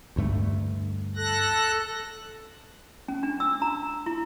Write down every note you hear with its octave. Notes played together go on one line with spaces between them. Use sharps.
D2 G2 A3
A4 F#6 A#6
C#4
D4
E6
A#5
E4